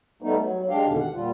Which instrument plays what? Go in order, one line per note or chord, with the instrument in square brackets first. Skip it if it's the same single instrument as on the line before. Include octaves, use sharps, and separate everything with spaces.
[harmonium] G3 A3 B3 D#4
F#3
G#3 D4 G4 F5
E2 B2 D3 D#3
F#5
A#2 G3 F4